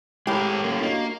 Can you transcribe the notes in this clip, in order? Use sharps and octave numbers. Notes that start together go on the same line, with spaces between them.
A2 G#3 E4 G4 A#4 C#5
A#3 C#4
A#3 D4 F#4 D#5